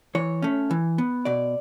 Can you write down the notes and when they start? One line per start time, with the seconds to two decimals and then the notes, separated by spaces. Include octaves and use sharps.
0.15 E3 C#5
0.42 A3 C#4
0.71 E3
0.98 B3
1.25 B2 D5